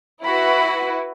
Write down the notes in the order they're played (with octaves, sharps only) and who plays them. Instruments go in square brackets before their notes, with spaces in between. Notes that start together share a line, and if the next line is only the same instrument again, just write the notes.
[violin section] E4 F#4 B4 [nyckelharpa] B5